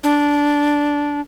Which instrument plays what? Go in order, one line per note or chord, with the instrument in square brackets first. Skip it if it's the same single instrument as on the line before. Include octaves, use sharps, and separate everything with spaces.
[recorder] D4